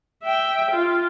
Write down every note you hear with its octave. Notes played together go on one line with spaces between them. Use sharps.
E5 G5
F4